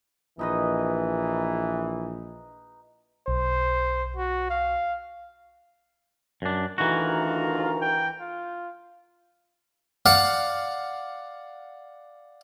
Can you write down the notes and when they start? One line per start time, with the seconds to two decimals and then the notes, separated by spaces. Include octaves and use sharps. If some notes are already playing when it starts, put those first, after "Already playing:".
0.39 A#1 E3 D#4 B4 D#5
3.28 B1 C5
4.16 F#4
4.50 F5
6.42 F#2 D4
6.78 D2 D#3 E3 F4 F#4 A#5
7.81 G5
8.20 F4
10.06 D5 F5 F#5